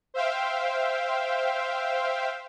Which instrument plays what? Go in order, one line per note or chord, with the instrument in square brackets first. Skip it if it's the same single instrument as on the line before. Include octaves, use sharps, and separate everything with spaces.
[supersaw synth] C5 E5 F5 G5